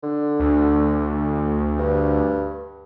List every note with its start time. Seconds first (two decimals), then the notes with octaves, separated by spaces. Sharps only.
0.03 D3
0.40 D2
1.79 G2